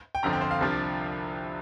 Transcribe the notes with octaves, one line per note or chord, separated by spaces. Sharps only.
G5
G1 F2 D3 F3 C4 A#5
G5
C5
F5
C2 C3 F3 D4 F4